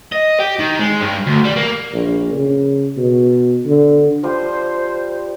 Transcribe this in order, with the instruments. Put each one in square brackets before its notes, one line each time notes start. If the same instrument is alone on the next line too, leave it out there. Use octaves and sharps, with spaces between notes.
[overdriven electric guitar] D#5
G4
D#3
G#3
G2
D2
G3
A#3
[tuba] A#1
C#3
B2
D3
[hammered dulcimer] F3 G3 F4 [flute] C5